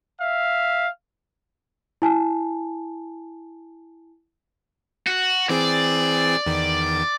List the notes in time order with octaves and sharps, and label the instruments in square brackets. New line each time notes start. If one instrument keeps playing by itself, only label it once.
[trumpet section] E5 F5
[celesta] E4 G#5 A5
[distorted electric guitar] F#4
[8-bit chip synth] E3 C4 G#4 [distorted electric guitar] D5
[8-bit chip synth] E2 D#3